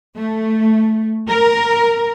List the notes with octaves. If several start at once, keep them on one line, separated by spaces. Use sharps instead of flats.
A3
A#4